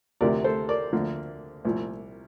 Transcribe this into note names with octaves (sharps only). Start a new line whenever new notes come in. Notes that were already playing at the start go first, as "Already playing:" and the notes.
D2 C3 F3 A#4 D5
A4 C5
A#4 D5
D2 D3 F3 A#3
C2 A#2 F3